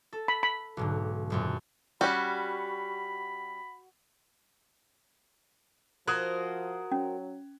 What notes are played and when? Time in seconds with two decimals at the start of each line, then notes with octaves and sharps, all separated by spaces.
0.13 A4
0.28 B5
0.43 B5
0.77 B1 G#2 D3
1.30 F#1 F#2 A#2
2.01 G3 C#4 F#4 B5
6.07 F3 F#4 A#4 C5 D#6 F#6 G#6
6.92 F#3 C#4